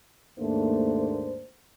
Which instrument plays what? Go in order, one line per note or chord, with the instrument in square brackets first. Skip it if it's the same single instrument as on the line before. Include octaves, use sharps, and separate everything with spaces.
[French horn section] D#2 G#2 A3 A#3 D4 C5